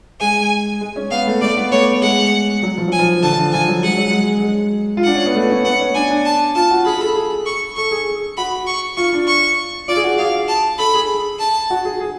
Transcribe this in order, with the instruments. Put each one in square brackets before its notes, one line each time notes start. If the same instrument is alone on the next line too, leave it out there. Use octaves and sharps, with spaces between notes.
[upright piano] G#3 [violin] G#5
[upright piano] G#3
C#4
[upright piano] B3 [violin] F5
[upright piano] A3
[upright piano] A3 [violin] D5
[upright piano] B3
[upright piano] A3 [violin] C#5
[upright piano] G#3 [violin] F#5
[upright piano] F#3
F3
[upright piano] F#3 [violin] G#5
[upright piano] F3
[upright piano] D3 [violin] A5
[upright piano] F3
D3
[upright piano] F3 [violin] G#5
[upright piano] F#3
[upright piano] G#3 [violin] F#5
[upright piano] F#3
G#3
G#3
F4
[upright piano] D4 [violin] F#5
[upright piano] C#4
B3
A3
C#4
[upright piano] B3 [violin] F#5
[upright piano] C#4
[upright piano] D4 [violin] G#5
[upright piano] D4
[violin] A5
[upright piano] F4 [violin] A5
[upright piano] F#4
[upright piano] G#4 [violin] B5
[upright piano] A4
G#4
[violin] C#6
[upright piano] A4 [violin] C#6
[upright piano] G#4
[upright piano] F#4 [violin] B5
[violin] C#6
[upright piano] F4 [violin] C#6
[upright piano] D4
[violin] C#6
[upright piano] F4 [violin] D5
[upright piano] G#4
F#4
[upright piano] G#4 [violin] F5
[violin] A5
[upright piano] A4 [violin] B5
[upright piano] G#4
[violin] A5
[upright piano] F#4
G#4
G#4